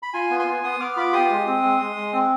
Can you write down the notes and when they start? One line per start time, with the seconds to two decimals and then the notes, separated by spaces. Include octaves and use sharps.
0.03 B5
0.14 F4 G#5 C6
0.30 B3
0.39 G#5 C6
0.47 B3
0.64 B3 C6 D#6
0.80 B3 D6 F6
0.97 F4 B5 D6
1.13 G4 C6 D#6
1.30 G#3
1.46 C4
1.63 G#3
1.80 G#3
1.96 G#3
2.13 C4